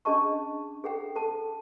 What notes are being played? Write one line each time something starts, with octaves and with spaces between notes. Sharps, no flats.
C#4 D4 G#4 D#5 A5 C#6
G#4 A4 F#5 G5
A4 A5